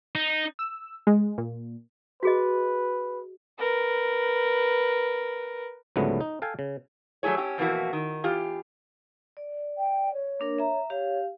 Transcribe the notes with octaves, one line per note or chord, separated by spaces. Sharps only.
D#4
E6
G#3
A#2
F#4 G#4 B4 D#5
A#4 B4
C#2 G#2 D3 F#3 A3 B3
D#4
A4 F5 G5 G#5
C#3
F#3 G3 A3 E4 G#4 C#5
C#4 G4
F2 B2 E3 A#3 F#4
D#3
E2 F4 G4
D5
G5
C#5
A#3 D4 A#4
E5 A#5
G4 C#5 F5